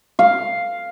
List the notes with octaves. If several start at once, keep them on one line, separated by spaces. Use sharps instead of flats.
F5